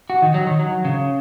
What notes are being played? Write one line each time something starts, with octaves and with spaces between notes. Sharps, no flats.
F#4
D#3
F#3
D#3
F#3
C#3